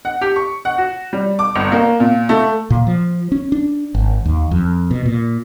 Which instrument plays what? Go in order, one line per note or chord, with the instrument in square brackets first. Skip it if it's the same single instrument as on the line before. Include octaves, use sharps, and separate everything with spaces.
[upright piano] F#5
G4
C#6
F#5
F#4
G3
D6
G1
A#3
A#2
A3
[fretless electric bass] A#2
F3
C#4
D4
G#1
D#2
F2
B2
A#2